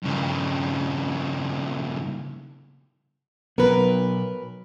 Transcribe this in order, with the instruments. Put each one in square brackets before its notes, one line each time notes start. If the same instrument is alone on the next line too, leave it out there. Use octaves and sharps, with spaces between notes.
[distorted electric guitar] G2 C#3
[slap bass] B2 F#3 B3 [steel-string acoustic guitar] A#4 B4